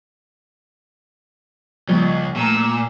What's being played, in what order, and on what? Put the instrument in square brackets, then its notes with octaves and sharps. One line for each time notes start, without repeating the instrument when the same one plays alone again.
[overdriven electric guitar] C#2 [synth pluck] F3 G3 [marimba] A#3 F4 D5
[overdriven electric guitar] A#2 [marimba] A3 [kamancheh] A#5 E6